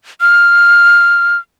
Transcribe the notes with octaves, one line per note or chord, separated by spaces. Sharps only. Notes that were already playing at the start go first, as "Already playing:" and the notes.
F6